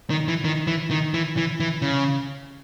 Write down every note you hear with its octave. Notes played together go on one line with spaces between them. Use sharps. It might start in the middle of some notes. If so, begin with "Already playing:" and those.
D#3
E3
D#3
E3
D#3
E3
E3
E3
C#3